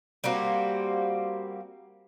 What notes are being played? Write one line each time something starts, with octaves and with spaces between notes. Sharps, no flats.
G3 A#3 C4 F#4